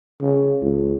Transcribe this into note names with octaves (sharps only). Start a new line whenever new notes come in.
C#3
C#2